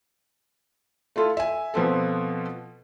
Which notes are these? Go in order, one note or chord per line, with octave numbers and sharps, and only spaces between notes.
A3 E4 F4 A4
E5 G#5
B2 F3 B3 C4 A4